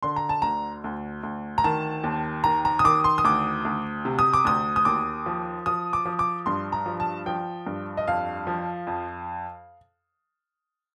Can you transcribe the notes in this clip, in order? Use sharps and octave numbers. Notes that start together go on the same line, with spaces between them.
D3 C6
A#5
A5
D2 A#5
D2
D2
A#5
D#3 A5
D#2
D#3 A#5
A#5
D#6
D#3 D6
C6
D#6
D2 D6
D2
C3
D#6
D6
D2 D#6
D#6
D#2 D6
F3
F3 D#6
D6
F3
D6
G2 C6
A#5
F3
A5
F3 G5
G2
D#5
F2 F5
F3
F2